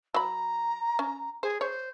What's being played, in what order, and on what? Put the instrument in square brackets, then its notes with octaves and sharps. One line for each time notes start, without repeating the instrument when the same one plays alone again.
[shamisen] F#3 B5 [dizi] A#5
[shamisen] C#4
[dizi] G#4 [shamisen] C5
[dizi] C5 [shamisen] C#5